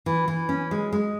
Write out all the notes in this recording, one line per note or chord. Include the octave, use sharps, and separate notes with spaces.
E3
E3
C#4
G#3
G#3